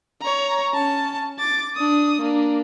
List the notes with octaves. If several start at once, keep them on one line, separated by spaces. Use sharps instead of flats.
C#5 A#5
C#4 A5
D6 A6
D4 D#6
A#3 D4